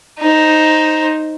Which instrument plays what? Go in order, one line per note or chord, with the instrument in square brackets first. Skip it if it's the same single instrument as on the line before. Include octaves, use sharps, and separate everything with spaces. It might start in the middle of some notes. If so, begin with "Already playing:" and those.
[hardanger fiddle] D#4 C5